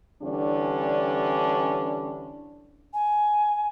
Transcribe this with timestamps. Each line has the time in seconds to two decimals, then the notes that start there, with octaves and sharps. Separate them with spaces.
0.23 D3 E3 G3 C#4 D4
2.94 G#5